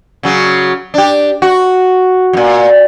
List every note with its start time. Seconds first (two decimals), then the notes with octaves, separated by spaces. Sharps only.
0.23 C#3 F#3
0.94 D4 G4
1.42 F#4
2.33 F#2 A#2